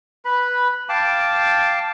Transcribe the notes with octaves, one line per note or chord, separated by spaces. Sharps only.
B4 B5
F5 G5 A5 D6